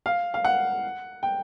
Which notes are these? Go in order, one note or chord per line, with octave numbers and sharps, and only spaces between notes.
F5
F5
F#5
G5